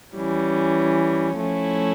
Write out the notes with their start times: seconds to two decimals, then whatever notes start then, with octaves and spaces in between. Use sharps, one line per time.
0.16 E3 G3 C#4
1.37 F3 A3 C#4 E4